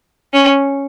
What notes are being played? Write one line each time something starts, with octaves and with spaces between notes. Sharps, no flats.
C#4